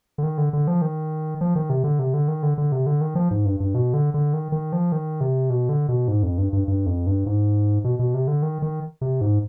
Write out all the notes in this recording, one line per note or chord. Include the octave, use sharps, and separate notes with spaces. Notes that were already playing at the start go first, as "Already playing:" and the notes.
D3
D#3
D3
D3
F3
D#3
F3
D#3
C3
D3
C3
D3
D#3
D3
D3
C3
D3
D#3
F3
G#2
G2
G2
B2
D3
D3
D#3
D#3
F3
D#3
C3
B2
D3
B2
G#2
F2
G2
G2
G2
F2
G2
G#2
B2
B2
C3
D3
D#3
D#3
C3
G#2